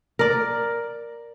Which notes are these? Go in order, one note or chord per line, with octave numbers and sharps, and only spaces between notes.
A#4 D5